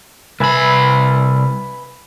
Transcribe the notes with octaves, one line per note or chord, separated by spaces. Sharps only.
C2 B4 E5 G#5 B5